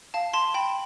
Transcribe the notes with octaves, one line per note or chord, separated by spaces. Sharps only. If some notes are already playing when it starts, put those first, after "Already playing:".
F5 A5
A5 C6
G5 B5